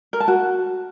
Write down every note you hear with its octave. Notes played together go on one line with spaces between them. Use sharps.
A#4
A5
F#4